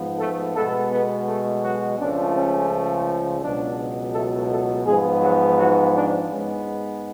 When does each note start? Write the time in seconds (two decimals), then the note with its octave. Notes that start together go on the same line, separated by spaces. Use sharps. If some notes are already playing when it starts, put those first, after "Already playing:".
Already playing: G#2 F3 B3
0.19 A3 A4
0.54 B2 G#3 A3 B3 A4
0.91 B3 B4
1.26 A3 A4
1.63 F#3 F#4
1.98 C#2 C#3 F3 A3 D4
2.34 C#4
3.41 C#2 B2 F#3 D4
4.14 A3 A4
4.50 A3 A4
4.85 G#2 F3 G#3 B3 G#4
5.21 F#3 F#4
5.57 F#3 F#4
5.93 D4
6.29 G#2 G#3 B3 C#4